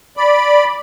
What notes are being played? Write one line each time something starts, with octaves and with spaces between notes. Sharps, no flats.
D5 B5